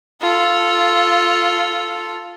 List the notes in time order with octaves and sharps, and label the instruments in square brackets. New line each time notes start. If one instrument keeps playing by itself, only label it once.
[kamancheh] F4 A4